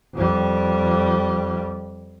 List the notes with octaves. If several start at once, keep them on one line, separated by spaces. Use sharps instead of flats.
F2 G3